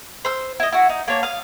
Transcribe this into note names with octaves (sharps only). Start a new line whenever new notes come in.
C5 E6
E4 D#5
E4 F#4
D#4
A#3 D4 C#5
F5 D#6